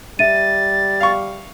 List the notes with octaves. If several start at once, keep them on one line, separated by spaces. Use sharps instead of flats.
G3 E5 A6 D#7
F5 C#6